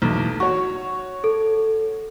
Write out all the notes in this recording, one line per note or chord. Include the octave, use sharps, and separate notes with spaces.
B1 E2 A3
F#4 C#5 C#6
A4